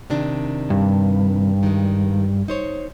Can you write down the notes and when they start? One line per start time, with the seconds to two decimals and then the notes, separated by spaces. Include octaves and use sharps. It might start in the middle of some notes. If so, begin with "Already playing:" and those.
0.10 C3 D#3 D4
0.70 G2
1.63 D#3 G#3
2.48 D#4 C5 C#5